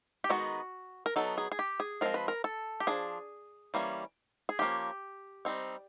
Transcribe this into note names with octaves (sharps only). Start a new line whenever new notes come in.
G4
D#3 G#3 B3 D#4 F#4
A#4
F#3 B3 D#4 A4
G#4
G#4
G4
G#4
F3 G#3 C4 A#4
B4
A#4
A4
G4
F3 A#3 D4 G#4
E3 G3 A#3 C#4
G#4
F3 A#3 C#4 G4
G3 C4 D#4